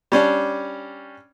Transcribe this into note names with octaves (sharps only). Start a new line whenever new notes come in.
G3 C#4 D4